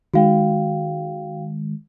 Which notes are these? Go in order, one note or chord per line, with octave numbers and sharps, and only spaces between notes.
D#3 G#3 F#4 F5 G5